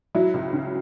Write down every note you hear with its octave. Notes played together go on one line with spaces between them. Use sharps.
F#3 E4
C#2
C#3